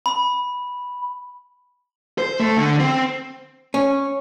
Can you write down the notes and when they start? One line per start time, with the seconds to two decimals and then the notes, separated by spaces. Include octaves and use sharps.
0.06 B5
2.18 C5
2.40 A3
2.57 D3
2.80 C4
3.74 C#4